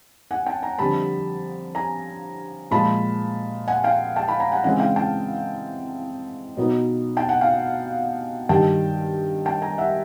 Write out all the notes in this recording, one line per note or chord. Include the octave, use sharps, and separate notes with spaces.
F#5 G#5
G5 A5
G#5 A#5
F2 D3 G3 A5 B5
G#5 A#5
A#2 F3 G#3 A5 B5
F#5 G#5
F5 G5
G5 A5
A5 B5
G#5 A#5
F#5 G#5
C#3 E3 G#3 C4 F#5 G#5
F5 G5
G5 A5
B2 F#3 B3 D#4
G5 A5
F#5 G#5
F5 G5
G2 D#3 G3 G5 A5
G5 A5
G#5 A#5
E5 F#5